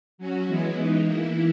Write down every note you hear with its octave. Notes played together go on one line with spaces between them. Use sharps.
F#3 C#4 F#4
E3 G#3 B3 E4
E3 G#3 D#4
E3 A#3 E4